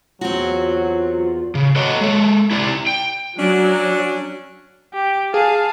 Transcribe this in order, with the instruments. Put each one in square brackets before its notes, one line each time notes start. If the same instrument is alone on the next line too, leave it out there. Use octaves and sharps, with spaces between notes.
[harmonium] E2 [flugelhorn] F#3 [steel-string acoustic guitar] C4 F#4 [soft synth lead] F4
[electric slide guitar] C#3
F#4 A4 C#5 D#5
G#3 A4
E4 G4 D5
G5
[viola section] F#3 [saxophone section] C#4 D4
[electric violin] G4
[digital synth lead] G#4 [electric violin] F5 A5